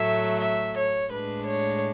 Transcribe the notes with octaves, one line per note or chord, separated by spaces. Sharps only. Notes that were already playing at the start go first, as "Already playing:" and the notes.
Already playing: A2 F#3 A3 E5
E5
C#5
A2 G#3 D4 B4
C#5